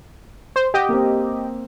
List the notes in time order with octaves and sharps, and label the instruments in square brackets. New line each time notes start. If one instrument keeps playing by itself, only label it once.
[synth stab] C5
[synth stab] G4 D#5 [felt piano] F#5
[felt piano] A#3 C4